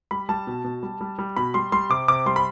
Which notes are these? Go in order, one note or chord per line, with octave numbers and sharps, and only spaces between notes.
G3 B5
G3 A5
B2
B2
G3
G3
G3
B2 B5
G3 C6
G3 C6
C3 D6
C3 D6
G3 C6
B5